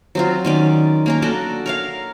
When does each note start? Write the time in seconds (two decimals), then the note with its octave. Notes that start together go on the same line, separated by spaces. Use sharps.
0.15 F#3 C4 F4
0.45 D#3 C#4 D5
1.06 A#3 C#4 A#4
1.22 D4 F#4 A4 D5
1.66 A#4 C#5 F5